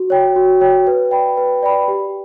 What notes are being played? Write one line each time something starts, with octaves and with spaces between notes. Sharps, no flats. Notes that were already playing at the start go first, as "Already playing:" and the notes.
Already playing: F#4
C#5 G5
F#4
C#5 G5
B4
D5 G5 B5
B4
D5 G5 B5
G4